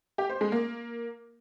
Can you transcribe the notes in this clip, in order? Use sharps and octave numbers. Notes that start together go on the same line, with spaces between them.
G4
C5
G#3
A#3